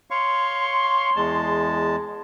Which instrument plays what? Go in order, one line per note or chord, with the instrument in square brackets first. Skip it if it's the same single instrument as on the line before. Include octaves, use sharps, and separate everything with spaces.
[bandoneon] C#5 F5 C#6 [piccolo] C6
[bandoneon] E2 G#3 A5